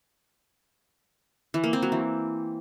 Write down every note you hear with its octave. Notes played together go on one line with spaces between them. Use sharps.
E3
A#3
C4
F#3
E3